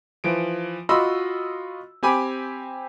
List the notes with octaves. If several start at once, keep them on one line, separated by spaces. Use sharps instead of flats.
E3 F3 D7
F4 F#4 D#5 B5 C6 E6
C4 G4 G#5 B5 D6 D#7